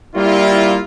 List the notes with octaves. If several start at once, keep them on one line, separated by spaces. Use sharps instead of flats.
G3 A#3 E4 F4